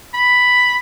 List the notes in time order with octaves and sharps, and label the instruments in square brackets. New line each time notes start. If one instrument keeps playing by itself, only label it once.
[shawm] B5